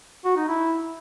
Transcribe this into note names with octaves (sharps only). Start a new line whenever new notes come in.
F#4
D#4
E4